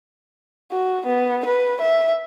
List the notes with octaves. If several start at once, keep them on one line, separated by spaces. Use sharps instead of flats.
F#4
B3
B4
E5